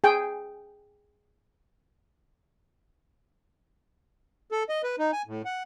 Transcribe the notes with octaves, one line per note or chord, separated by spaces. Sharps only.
G#4 G5
A4
D#5
B4
D#4
G#5
A2
F#5